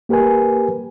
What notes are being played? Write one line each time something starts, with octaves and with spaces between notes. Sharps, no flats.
A#3 G4 A#4 B4 G#5